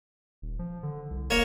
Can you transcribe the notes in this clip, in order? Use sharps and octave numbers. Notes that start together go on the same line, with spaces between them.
D#1
F3
D3
C2
E1 A#3 C#5